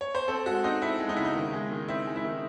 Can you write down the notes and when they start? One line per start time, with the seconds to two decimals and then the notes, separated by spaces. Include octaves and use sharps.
0.01 C#5
0.15 C5
0.28 C4 A4
0.46 G#3 F#4
0.64 C4 D#4
0.82 C4 E4
1.00 G#3
1.09 D#4
1.17 C#3 E4
1.25 D#4
1.35 D#3
1.53 G#3
1.71 D#3
1.88 C4 E4
2.07 G#3
2.16 E4
2.25 D#3